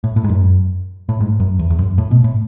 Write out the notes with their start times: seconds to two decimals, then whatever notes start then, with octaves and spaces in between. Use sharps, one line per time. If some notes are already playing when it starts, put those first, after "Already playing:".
0.04 A2
0.16 A2
0.24 G#2
0.29 F#2
1.09 A2
1.21 G#2
1.40 F#2
1.59 E2
1.70 E2
1.79 F#2
1.98 A2
2.11 B2
2.24 A2